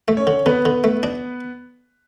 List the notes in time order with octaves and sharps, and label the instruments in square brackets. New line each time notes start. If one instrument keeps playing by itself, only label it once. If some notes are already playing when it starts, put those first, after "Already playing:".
[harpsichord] A3
[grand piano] C#4 C#5
[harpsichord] D3
[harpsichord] D3 [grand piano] B3 B4
[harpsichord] D3
A3
D4